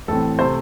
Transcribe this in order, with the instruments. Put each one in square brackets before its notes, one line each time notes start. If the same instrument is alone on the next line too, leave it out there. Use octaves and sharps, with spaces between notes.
[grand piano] A1 A2 E3 C4 A4
C3 A3 C5